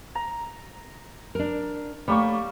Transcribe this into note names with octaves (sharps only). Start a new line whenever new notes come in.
A#5
D4 A#4
G3 A3 A#3 C#5 C#6